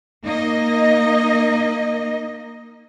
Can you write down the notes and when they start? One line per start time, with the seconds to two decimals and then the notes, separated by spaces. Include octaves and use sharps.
0.24 A#3 D#4 D#5